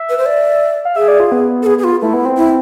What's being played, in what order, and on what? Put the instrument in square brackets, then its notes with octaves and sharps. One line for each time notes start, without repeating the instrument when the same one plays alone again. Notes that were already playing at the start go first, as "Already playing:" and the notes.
Already playing: [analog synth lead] E5
[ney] B4
C5
D5
[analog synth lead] F5
[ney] G#4 [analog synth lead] E5
[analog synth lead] D5
F4
B3
[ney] A4
[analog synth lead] B3 [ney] G#4
[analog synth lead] B3 [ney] G#4
[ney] F4
[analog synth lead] A3 [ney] E4
[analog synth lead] B3
C4
[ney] E4